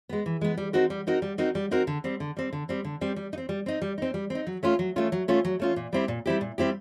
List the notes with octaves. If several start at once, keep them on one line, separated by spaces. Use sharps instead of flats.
G#3 B3
E3
G#3 B3
G3
C4 D#4 F#4 A#4
G3
C4 D#4 F#4 A#4
G3
C4 D#4 F#4 A#4
G3
C4 D#4 F#4 A#4
D3
G3 C4
D3
G3 C4
D3
G3 C4
D3
G3 C4
G3
D#4
C4
G3
C4 D#4
G3
C4 D#4
G3
C4 D#4
F#3
A3 C#4 F4
F#3
A3 C#4 F4
F#3
A3 C#4 F4
F#3
A3 C#4 F4
A#2
G3 C4 E4 G4
A#2
G3 C4 E4 G4
A#2
G3 C4 E4 G4